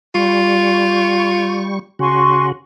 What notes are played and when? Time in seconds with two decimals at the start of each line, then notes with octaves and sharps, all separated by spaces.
0.15 G3 F4 C#6
1.99 C#3 F#4 G#5 C6 C#6